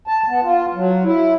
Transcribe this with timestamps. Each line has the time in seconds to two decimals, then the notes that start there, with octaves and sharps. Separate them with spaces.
0.07 A5
0.29 B3
0.44 F4
0.74 F#3
1.04 E4